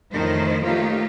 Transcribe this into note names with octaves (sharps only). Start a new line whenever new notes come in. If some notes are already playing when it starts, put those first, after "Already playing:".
F2 A2 D#3 F3 A3 C5
F#3 A3 A#3 D#4 F4 G4